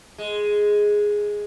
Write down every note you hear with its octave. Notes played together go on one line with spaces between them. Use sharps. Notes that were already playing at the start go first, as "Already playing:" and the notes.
G#3